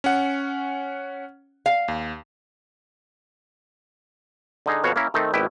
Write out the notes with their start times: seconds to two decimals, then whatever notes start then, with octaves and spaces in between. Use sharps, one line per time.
0.04 C#4 F#5
1.66 F5
1.88 D#2
4.66 D3 D#4 G#4
4.84 F2 B2 F#4 C#5 F5
4.96 A#3 C#4 E4 A#4
5.14 D#3 A3 C4 D#4
5.34 G#1 B2 E4 G4 B4 G5